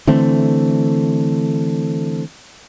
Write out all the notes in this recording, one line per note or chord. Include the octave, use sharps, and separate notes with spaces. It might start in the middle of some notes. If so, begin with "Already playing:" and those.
D3 E3 A3 C4